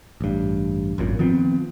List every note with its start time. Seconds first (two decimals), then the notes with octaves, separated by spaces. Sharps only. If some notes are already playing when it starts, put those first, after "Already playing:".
0.21 A1 G2
0.98 G#1 F#2 A#2
1.19 D#3 F3 B3 C4